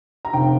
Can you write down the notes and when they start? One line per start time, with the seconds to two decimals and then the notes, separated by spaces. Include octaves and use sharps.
0.25 A#5
0.33 F1 G5